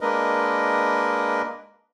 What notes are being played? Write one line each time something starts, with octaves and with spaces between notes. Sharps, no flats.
G#3 A#3 D4 A#4 B4 D#5